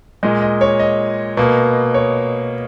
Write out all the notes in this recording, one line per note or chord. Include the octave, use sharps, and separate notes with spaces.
A#2 G#3 D#5
D#5
C#5
D#5
B2 A#3
C#5